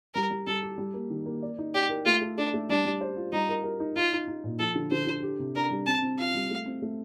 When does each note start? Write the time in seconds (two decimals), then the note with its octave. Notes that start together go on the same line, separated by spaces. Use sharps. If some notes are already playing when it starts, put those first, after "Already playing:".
0.14 G3 A#4
0.30 G3
0.47 G3 A4
0.63 G4
0.78 G3
0.94 A#3
1.10 D#3
1.26 A#3
1.42 D5
1.58 D#4
1.74 G4 D5
1.89 A#4
2.05 A3 F4
2.21 A4
2.37 D4 A4
2.54 A3
2.69 G3 D4
2.85 G3
3.01 C5
3.16 F4
3.32 G3 D#4
3.49 A#4
3.64 A#4
3.80 D#4
3.95 D#4 F4
4.13 D#4
4.27 D#4
4.44 A#2
4.59 F3 A4
4.75 D3
4.91 D3 C5
5.07 D3
5.23 G4
5.39 C3
5.55 D4 A#4
5.70 G3
5.86 C4 A5
6.02 C4
6.18 F4 F5
6.34 G3
6.50 A3
6.66 C4
6.82 A3